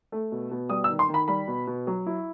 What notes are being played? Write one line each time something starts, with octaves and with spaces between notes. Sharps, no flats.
A3
B2
B2
G3 D#6
E6
D#3
C6
D#3
B5
G3 B5
B2
B2
F#3
E4